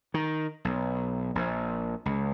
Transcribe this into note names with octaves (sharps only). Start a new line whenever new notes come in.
D#3
B1
A#1
C#2